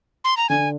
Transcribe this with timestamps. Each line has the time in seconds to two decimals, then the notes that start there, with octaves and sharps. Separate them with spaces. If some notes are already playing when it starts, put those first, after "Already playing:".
0.24 C6
0.37 A#5
0.49 D3 G#5